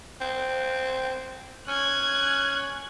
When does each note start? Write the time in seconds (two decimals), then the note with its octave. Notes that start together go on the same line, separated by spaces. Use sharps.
0.21 C4
1.68 C#4 F#6 G#6